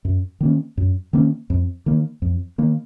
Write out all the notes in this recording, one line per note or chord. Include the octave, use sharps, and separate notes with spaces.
F#2
D#3 A#3 C#4
F#2
D#3 A#3 C#4
F2
D#3 A#3
F2
D#3 A#3